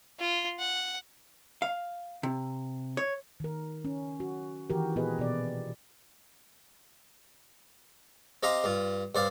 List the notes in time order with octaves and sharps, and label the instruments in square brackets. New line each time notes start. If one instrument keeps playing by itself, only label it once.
[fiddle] F4
F#5
[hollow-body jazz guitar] F5
C3
C#5
[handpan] D#3 A#4
C#4
F#4
D#3 E3 F#4 G4 A#4
A#2 B3 F#4 G#4 B4 D#5
B2 D5
[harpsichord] C4 G4 D#5 F5 A#5 C6
G2 F4
G2 C5 D5 F5